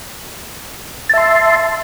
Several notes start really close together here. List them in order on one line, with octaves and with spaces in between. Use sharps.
A5 E5 C6